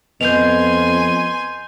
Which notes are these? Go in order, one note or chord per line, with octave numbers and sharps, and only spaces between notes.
F2 B3 B4 D#5 G#5 C6 G6 F7